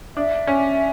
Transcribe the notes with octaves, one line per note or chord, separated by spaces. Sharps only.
D4 E5
C#4